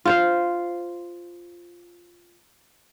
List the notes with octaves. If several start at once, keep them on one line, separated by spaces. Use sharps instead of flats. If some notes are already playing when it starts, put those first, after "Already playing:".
F4 C5 F5